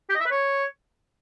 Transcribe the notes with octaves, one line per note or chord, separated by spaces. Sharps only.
G4
D#5
E5
B4
C#5